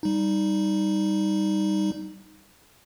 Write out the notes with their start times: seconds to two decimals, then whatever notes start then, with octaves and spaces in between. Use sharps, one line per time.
0.03 G3 D#4